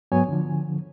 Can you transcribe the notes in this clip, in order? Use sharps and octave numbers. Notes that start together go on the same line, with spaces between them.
G#2 F#3 B3 C#5 G#5
D3 F3